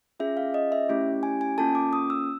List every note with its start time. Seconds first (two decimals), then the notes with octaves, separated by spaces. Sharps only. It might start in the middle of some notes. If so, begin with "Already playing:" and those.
0.20 C#4 F4 G#4 E5
0.37 F5
0.54 D#5
0.72 E5
0.89 A3 C#4 E4 G4
1.23 G#5
1.41 G#5
1.58 A#3 C#4 F4 A4 A5
1.75 D6
1.93 D#6
2.10 E6